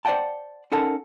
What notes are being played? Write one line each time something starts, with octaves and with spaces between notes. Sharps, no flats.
C5 D5 D#5 F#5 G5 A5
C#4 D#4 A4 A#4 F#5 A5